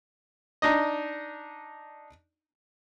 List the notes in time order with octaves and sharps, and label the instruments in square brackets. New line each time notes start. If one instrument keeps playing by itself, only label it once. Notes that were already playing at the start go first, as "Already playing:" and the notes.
[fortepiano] D4 D#4 D#5